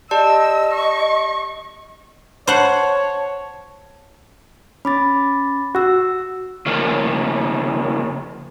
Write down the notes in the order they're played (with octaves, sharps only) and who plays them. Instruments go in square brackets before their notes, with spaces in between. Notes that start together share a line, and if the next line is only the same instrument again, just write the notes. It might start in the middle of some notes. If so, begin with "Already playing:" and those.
[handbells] G4 D5 A5 [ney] D#5 [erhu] E6
[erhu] C#6
[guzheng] C5 F#5 [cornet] C#5 [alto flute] A5
[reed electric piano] C#4 [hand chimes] B5 D6 A6
[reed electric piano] F#4 [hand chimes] F#5 E6
[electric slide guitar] C#3 F3 A#3 A#4